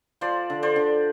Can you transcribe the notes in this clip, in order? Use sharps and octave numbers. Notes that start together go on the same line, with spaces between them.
F3 C5 D5
D3
C5 D5
D3